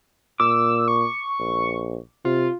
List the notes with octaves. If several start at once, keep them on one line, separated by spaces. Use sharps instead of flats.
A#2 D6 E6
C#6
A#1
C3 F4